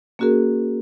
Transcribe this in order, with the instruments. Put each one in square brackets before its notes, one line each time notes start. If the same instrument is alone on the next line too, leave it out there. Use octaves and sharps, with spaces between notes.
[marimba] A#3 C#4 F#4 G#4 A#4